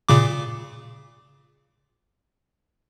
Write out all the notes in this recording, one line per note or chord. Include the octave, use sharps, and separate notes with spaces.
A#2 C#3 D6